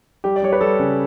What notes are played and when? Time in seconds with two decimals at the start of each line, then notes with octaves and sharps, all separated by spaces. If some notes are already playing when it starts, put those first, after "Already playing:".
0.24 G3 G4
0.36 D5
0.42 G3 C#5
0.53 B4
0.61 G3 A4
0.79 C#3